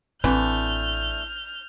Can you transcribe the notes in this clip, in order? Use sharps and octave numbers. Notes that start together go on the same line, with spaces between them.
A1 D3 E3 A3 C4 E4 F6 G6